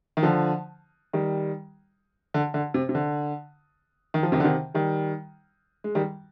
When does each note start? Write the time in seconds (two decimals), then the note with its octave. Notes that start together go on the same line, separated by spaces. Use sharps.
0.17 D#3
0.23 D3 F3
1.13 D#3 G3
2.34 D3
2.54 D3
2.74 C3
2.89 C3
2.95 D3
4.14 D#3
4.23 F3
4.32 C3 D#3
4.40 D3
4.44 C3 D#3
4.74 D#3 G3
5.84 G#3
5.95 D#3 G3